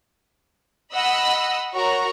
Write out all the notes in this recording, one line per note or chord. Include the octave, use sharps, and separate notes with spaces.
D#5 F#5 B5 E6
F#4 A#4 C#5 A#5 C#6